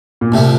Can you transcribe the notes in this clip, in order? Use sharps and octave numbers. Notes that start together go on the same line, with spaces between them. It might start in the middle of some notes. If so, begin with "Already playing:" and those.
A#2
C2 A2 C3 F3 C4